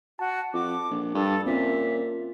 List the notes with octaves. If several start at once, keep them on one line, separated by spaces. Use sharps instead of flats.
F#4 A5
F2 D6
A#1
G2 A4
A#2 C4 C#4 E5